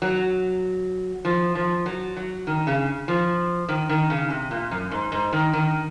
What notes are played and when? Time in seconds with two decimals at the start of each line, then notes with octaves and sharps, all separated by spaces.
0.02 F#3
1.25 F3
1.55 F3
1.86 F#3
2.17 F#3
2.47 D#3
2.67 C#3
3.08 F3
3.69 D#3
3.89 D#3
4.10 C#3
4.30 C3
4.51 A#2
4.71 F#2
4.91 G#2
5.12 G#2
5.33 D#3
5.53 D#3